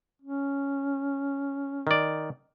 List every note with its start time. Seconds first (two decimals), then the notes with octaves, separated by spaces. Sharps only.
0.22 C#4
1.87 D#3 D5